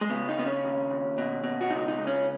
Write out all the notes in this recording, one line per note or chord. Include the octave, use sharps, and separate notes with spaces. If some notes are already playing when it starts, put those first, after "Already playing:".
G#3
C#3 B3
D#4
C#3 B3
C#4
D#2
D#2
B2
B2
F#4
C#2 D#4
D#4
C#2
C#4